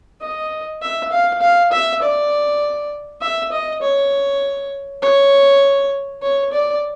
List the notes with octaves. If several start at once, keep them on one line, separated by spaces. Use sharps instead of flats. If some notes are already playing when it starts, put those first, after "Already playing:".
D#5
E5
F5
F5
E5
D5
E5
D#5
C#5
C#5
C#5
D5